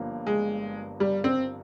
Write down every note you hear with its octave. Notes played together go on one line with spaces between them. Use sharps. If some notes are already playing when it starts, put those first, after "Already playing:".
Already playing: G1 G2 F3 A#3
G#3
G3
C4